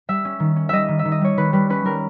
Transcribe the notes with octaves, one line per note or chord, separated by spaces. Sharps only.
G3 E5
C#4
D#3
C#4
G3 D#5 E5
D#3
E5
D#3
D#5
G3 C#5
D#3 B4
G3 B4
C#4 B4
G3 A#4